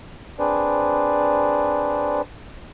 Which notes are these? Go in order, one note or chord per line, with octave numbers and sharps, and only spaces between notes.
C4 D4 G#4 B4 C5 D5